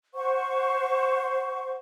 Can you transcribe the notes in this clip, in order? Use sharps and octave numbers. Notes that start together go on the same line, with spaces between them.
C5 F#5 C#6